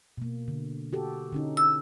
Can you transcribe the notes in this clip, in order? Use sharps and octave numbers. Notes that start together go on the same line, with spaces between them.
B2 A#3
D3
F#4 G4 A4
D3 C#4 D#4
E6